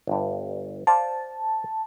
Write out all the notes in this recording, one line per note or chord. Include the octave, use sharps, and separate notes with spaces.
G1 G2
C5 D5 F5 A5